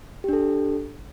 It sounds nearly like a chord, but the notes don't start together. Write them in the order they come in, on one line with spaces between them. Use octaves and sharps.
G4 D4 A4